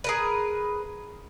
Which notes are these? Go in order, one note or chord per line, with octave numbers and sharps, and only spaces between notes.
G#4 A#4 B4